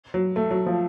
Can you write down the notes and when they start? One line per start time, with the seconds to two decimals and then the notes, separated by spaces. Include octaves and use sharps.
0.14 F#3
0.36 A3
0.51 F#3
0.66 F3